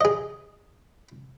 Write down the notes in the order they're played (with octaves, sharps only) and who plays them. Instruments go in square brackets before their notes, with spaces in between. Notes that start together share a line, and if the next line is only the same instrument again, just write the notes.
[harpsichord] G#4 D#5